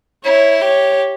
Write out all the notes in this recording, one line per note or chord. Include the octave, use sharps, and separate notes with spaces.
E4 C#5
G4 C#5